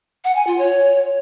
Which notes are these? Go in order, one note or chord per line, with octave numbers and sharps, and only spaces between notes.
F#5
G#5
F4
C#5